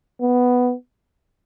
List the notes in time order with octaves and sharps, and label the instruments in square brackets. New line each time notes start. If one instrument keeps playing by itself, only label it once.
[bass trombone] B3